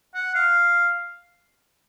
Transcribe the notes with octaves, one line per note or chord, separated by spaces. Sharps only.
F#5
F5